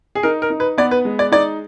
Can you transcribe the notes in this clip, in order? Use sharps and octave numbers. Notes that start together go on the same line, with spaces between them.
G#4
D#4 A#4
A#4
D#4
B4
B3 D5
B4
G#3
D5
D#4 D5